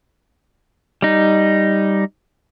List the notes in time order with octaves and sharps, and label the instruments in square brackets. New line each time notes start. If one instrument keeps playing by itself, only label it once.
[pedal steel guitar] G3 D#4